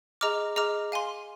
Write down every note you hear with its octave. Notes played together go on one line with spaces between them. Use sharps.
G#4 D#5 A#5 D6 F6
G#4 D#5 A#5 D6 F6
F5 G#5 C6